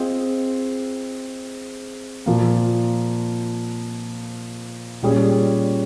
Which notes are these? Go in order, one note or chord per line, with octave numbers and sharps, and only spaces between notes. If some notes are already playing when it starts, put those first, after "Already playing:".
Already playing: C4 F4 G#4 D#5
A#2 F3 A#3
A#2 G3 C#4 G#4